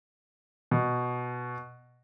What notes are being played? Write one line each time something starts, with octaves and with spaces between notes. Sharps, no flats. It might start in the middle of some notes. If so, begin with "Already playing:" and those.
B2